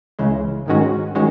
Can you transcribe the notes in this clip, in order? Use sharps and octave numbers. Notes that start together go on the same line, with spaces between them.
C#2 C#3 E3 G#3
G#2 D#3 G#3 C#4 F#4
D#3 G#3 C#4 F#4